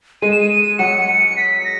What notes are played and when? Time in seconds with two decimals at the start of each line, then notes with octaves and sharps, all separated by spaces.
0.22 G#3 G#4 D#7
0.31 E7
0.40 D#7
0.50 D#7
0.79 F#3 F#4 C#7
1.08 C#7
1.37 B6
1.64 A#6